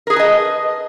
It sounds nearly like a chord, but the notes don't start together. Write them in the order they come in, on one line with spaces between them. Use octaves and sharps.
A#4 G#4 B4 A5 D#5